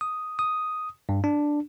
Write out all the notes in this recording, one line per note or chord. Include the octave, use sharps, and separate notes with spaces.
D#6
D#6
G2
D4